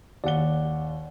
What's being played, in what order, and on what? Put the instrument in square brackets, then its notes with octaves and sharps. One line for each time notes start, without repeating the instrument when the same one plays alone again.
[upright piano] D#2 G7 [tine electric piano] D5 F#5